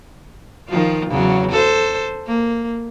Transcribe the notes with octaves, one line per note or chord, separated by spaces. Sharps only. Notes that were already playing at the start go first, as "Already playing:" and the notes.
D#3 F3 F4
E2 C#3 F#3
A4 C5
A#3